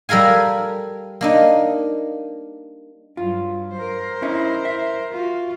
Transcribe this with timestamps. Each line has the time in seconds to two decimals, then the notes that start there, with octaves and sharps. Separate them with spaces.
0.09 G3 A4 A#4 F5 G#5
1.21 A#3 D4 D#4
3.17 G2 F#3 F4
3.73 A#4 C5
4.22 C#4 D#4 E4
4.65 E5
5.12 F4 F#4